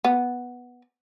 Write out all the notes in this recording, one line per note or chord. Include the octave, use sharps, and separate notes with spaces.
B3